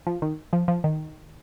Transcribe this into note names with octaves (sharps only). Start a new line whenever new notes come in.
F3
D#3
F3
F3
D#3